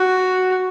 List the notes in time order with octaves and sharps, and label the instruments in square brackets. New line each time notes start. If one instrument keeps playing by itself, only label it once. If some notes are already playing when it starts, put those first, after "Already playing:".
Already playing: [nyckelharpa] F#4